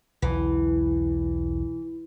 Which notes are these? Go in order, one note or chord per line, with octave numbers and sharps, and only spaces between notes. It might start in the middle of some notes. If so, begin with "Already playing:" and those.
B1 E2 D3 E3